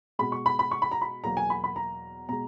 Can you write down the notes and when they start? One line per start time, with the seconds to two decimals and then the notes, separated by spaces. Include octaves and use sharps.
0.19 B2 G#3 B5
0.32 C#6
0.46 B5
0.59 B5
0.71 C#6
0.82 B5
0.92 A#5
1.01 B5
1.24 E2 B2 F#3 A#3 A#5
1.37 G#5
1.50 B5
1.64 B5
1.76 A#5
2.29 B2 G#3 A#5